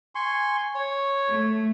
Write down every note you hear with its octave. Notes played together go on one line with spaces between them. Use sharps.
G#5 C6 C#6
C#5
A3